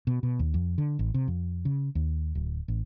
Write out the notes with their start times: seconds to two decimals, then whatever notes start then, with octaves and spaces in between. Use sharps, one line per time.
0.07 B2
0.23 B2
0.39 D#2
0.54 F2
0.78 D3
0.99 A1
1.14 C3
1.28 F2
1.65 C#3
1.95 D#2
2.35 D1
2.68 A1